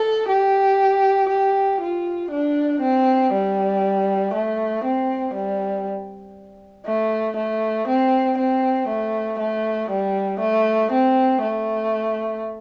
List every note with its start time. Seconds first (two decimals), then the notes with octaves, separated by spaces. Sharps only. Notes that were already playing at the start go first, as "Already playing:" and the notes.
Already playing: A4
0.29 G4
1.29 G4
1.81 F4
2.31 D4
2.81 C4
3.33 G3
4.34 A3
4.85 C4
5.34 G3
6.86 A3
7.37 A3
7.88 C4
8.38 C4
8.89 A3
9.40 A3
9.91 G3
10.41 A3
10.92 C4
11.42 A3